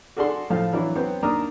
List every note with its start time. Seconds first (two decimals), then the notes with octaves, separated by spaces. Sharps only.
0.17 F#4 G#4 A4 D5 F#5 C6
0.50 A2 F3 A4 F5
0.73 E3 F#3 D4 E4 F#4
0.95 F#3 B3 C4
1.22 D#2 D4 A#4 A#5 D#6